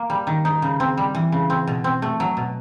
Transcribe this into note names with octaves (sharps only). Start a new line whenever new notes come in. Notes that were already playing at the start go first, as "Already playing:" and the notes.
Already playing: A#3
G3
D#3
D#4
C#3
C4
G3
E3
C#3
C4
B2
C4
A3
F#3
B2